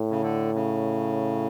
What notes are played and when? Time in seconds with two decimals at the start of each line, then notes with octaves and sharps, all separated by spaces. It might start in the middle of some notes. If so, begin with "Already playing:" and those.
Already playing: A2
0.11 C#3
0.22 D3
0.54 C#3